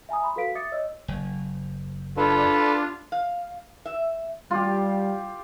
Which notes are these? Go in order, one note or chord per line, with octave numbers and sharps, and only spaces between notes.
E5 G#5 A#5 D#6
B5 C6
F#4 A4 B4 F5 B6 D7
E5 D6 D#6 A6 C#7
C#5 D#5 E6
F#1
D4 F4 A4 B4
F5
E5
G3 F4 G4